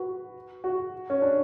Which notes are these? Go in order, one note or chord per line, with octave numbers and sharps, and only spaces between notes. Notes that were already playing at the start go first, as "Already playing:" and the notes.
Already playing: F#4 B4
F#4
C#4
D4